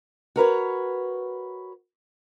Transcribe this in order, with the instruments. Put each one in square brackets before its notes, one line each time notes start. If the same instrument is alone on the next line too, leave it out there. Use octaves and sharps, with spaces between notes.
[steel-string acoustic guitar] F#4 A#4 B4 C#5